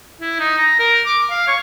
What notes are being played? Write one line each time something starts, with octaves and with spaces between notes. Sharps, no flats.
E4
D#4
A#5
A#4
D6
F5
C#5